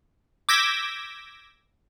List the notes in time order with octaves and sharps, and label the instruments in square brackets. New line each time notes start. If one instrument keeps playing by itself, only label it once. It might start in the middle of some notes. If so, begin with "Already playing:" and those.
[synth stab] D6 E6 G6 G#6 A#6 B6